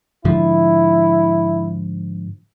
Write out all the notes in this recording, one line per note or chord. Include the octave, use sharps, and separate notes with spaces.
G#2 D3 F3 E4